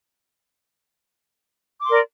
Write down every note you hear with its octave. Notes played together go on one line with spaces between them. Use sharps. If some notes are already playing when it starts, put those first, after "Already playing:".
A#4 D5 C6 D6